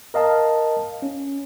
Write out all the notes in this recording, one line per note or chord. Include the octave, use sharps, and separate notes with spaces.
A#4 D#5 F5 A5
C#4